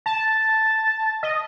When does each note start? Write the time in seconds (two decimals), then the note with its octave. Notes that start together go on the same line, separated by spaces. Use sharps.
0.06 A5
1.23 D#5